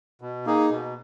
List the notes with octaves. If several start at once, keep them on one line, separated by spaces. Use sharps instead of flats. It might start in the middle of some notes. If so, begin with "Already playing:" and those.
B2
A#3 D#4 G#4
B2